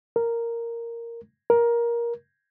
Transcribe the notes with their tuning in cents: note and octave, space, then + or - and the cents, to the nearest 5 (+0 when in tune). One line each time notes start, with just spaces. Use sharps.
A#4 -5
A#4 +15